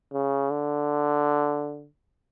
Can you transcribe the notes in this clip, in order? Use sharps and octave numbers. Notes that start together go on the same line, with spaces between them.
C#3
D3